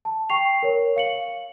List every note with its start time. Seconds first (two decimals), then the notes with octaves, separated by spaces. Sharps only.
0.05 A5
0.29 G5 C#6 C7 F7
0.63 A#4 C#5
0.96 F5 C#7 F#7